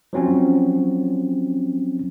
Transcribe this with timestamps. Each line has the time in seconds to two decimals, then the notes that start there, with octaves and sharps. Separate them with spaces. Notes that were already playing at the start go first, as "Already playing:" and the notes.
0.13 F3 F#3 C4 C#4